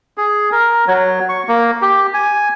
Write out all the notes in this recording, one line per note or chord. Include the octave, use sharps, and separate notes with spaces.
G#4
A#4
F#3
C#6
A#3
G4
G#5